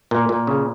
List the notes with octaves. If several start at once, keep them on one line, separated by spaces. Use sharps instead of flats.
A#2
A#2
C#3